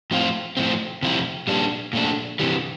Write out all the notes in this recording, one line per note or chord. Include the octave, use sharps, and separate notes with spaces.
A2 F3 C4 F4
A2 F3 C4
C3 F3 C4 E4
A#2 G3 D4
A#2 A3 D4
C3 E3 G3